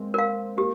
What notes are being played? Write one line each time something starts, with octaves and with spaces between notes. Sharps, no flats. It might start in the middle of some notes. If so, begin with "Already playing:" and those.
Already playing: G#3 A#3 C4
A#4 F5
A#3 G4